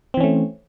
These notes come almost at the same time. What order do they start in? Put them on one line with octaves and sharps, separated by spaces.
C4 E3 C#4 A3